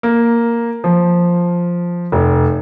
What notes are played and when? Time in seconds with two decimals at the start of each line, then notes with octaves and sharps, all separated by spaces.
0.03 A#3
0.84 F3
2.12 F1